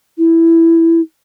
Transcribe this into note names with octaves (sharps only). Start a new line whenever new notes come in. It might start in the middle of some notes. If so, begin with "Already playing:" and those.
E4